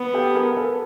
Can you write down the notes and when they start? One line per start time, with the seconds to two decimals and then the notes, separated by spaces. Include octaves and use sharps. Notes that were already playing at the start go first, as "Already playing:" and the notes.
Already playing: B3
0.14 G4 A4
0.34 G#4 A#4
0.52 A#4
0.57 A4 B4